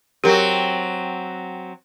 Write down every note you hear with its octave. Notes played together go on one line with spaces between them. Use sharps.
F#3 C4 G4 A#4